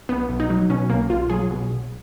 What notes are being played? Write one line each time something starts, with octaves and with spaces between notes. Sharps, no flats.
B1 B3
B1
D#4
F#3
B2 C#4
B1 A#3
B1 F4
F#3 G#4
B2
B1